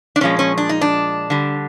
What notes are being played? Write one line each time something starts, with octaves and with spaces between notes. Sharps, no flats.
D4
A#2 F3 G#3 C#4
C#4
D4
D#4
D4
D3 G3